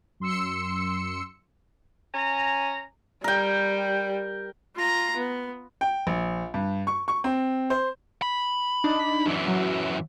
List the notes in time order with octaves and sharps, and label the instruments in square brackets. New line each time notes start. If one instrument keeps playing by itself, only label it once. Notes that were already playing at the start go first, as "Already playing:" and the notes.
[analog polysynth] F#2 C6 E6 C#7
[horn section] C#4 G#5 A#5
[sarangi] G3 [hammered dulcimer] A#4 G5
[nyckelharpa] F4 A#5
B3
[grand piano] G5
A#1
G2
C#6
C#6
C4
C5
[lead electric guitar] B5
[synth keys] D4 D#4
[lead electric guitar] F#2 E3
[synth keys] F#3